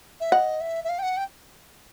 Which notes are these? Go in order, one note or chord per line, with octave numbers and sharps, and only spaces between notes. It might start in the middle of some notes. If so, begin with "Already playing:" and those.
E5
D#5 F#5
E5
E5
F5
G5
F#5
G5